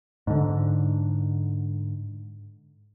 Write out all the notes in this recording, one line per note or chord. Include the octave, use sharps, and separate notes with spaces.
G#2 D3